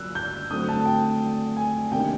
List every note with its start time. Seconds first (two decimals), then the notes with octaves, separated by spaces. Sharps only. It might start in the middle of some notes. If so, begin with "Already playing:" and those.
Already playing: F#3 A#3 C#4 F4 E6 F#6
0.15 G6
0.51 D3 F#3 A3 C4 D#6
0.69 A5
0.86 G5
1.57 G#5
1.92 C3 D#3 G3 A#3 D4 G5